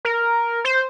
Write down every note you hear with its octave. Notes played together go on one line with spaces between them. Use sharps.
A#4
C5